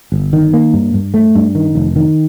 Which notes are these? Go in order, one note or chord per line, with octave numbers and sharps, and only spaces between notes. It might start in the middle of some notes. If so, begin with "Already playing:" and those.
G1
D#3
A#3
G2
G2
A3
G2
D#3
F1
D#3